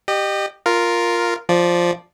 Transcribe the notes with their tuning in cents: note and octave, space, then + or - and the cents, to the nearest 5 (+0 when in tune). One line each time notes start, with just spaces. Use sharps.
G4 +0 D#5 -30
F4 +0 A#4 +0
F3 +0 D5 +0